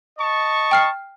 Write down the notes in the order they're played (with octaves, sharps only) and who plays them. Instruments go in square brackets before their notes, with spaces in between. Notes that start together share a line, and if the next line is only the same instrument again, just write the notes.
[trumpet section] D#5 A5 C#6
[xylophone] G5 F6 C7